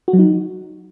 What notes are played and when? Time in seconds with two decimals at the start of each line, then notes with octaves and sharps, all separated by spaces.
0.08 F#4
0.13 F#3
0.19 D#4